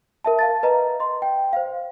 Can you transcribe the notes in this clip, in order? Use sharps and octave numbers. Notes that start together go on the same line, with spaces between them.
A#4 E5 A5
F5 A5 A6
B4 D#5 A#5
D#5 C6
G5
C5 F5